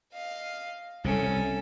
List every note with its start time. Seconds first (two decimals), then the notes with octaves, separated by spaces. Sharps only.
0.13 D#5 F5
1.04 C2 C3 C#4 A4